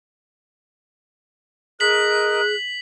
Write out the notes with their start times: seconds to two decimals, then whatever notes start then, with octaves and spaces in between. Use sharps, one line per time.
1.80 G#4 A#4 D#5 F#6 B6 F#7